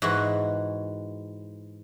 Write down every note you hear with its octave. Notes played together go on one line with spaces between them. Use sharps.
G#2 E3 F#4